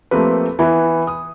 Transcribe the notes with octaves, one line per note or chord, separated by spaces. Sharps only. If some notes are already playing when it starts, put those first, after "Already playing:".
F3 A3 A#3 C4 G4 B4
E3 B3 E4
D#6